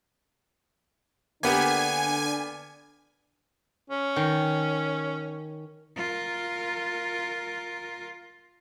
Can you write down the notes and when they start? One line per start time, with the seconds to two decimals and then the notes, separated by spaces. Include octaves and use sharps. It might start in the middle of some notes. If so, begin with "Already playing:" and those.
1.43 D3 A#3 B3 D4 G4 G#5
3.90 C#4
4.16 D#3
5.97 F4 A#4